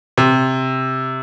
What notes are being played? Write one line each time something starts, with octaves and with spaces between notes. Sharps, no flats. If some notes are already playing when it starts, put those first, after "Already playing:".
C3